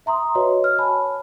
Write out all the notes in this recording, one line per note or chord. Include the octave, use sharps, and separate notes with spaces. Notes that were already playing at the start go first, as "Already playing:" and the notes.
E5 A#5 C6 D#6
F#4 B4 C#5 D#5
F6
C#5 G#5 A5 B5